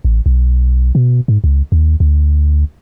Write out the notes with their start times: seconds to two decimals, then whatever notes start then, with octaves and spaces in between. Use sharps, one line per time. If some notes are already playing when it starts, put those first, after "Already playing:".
0.05 A1
0.26 B1
0.95 B2
1.28 G#2
1.44 C#2
1.72 D#2
2.00 D2